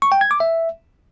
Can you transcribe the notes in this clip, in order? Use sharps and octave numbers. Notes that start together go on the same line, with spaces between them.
C#6
G5
G#6
D6
E5